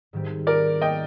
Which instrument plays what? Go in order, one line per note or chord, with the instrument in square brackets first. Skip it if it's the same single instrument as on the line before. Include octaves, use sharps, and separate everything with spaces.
[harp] G#2 D#3 G3 C4 G4
[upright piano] A#4 D5
D#5 G5